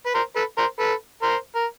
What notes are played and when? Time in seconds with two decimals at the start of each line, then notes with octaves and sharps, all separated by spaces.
0.06 B4
0.14 A#4 C5
0.36 A4 B4
0.58 A#4 C5
0.79 A4 B4
1.22 A#4 C5
1.55 A#4